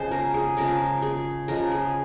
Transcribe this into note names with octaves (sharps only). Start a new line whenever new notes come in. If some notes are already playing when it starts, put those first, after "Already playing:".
Already playing: C#3 F3 G#3 C5
A#4
G#4
C#3 F3 G#3 A#4
G#4
C#3 F3 G#3 A#4
G#4